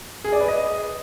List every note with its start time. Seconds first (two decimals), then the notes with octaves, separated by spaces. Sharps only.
0.24 G#4
0.32 D5
0.40 B4
0.48 D#5